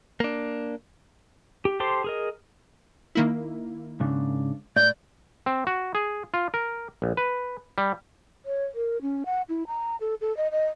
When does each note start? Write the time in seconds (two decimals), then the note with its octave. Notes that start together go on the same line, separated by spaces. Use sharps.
0.20 A#3 D4
1.65 G4
1.80 G4 A4 C5 C6 D6
2.04 G#4 A#4 D#5
3.15 D#3 A#3 E4
4.00 G#2 C#3 D4
4.76 A2 D5 G6
5.46 C4
5.67 F#4
5.95 G#4
6.34 F4
6.54 A#4
7.02 A#1
7.17 B4
7.78 G3
8.46 C#5
8.75 A#4
9.02 C#4
9.26 F#5
9.49 E4
9.67 A#5
10.01 A4
10.21 A4
10.37 D#5
10.51 D#5